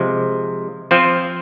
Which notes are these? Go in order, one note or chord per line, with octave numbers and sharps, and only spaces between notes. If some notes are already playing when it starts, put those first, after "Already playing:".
Already playing: C3 F3 G#3
F3 C4 F4 C5